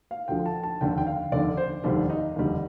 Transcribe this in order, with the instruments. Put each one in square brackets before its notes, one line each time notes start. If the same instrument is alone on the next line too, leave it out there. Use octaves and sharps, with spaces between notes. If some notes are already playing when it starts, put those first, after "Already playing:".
[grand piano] F5
D2 D3 F3 G5
A5
A5
F1 D#2 D3 G5
G5
F5
F1 D#2 D3 D5
C5
F1 D#2 D3 G3 D4
D#4
F1 D#2 D3 G3